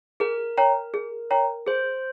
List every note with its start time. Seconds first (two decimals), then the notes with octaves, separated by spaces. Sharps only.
0.20 G#4 A#4
0.57 C#5 G5 A#5
0.94 G#4
1.31 C#5 G5 A#5
1.67 G#4 C5